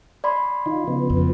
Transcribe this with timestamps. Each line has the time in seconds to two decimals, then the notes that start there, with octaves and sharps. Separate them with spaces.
0.24 D5 B5 C6
0.66 D#3 D#4 F4
0.87 C#3 F3 B3
1.10 F2